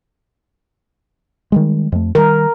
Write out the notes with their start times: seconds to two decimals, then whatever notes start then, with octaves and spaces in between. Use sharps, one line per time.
1.52 D#3 G3 G#3
1.92 F2 A3
2.15 D#3 G3 A#4